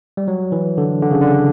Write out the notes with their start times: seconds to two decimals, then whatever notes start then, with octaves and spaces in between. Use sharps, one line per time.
0.17 G3
0.28 F#3
0.52 E3
0.78 D3
1.02 D3
1.11 C#3
1.21 D3